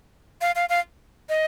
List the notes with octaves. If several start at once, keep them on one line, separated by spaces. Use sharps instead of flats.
F5
F5
F5
D#5